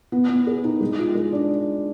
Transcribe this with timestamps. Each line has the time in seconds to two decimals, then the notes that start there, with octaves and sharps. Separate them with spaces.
0.12 B3
0.29 B3
0.47 G#4
0.64 D#4
0.81 G#3
0.98 F4
1.15 G#3
1.32 D4